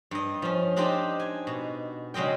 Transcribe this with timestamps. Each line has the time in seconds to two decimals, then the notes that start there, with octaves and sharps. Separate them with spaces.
0.11 G2 D#5
0.42 F3 C#4
0.76 D4 D#4 G4 C5 D#5 G5
1.20 G#5
1.47 B2
2.14 C#3 F#3 G#3 D#5 G5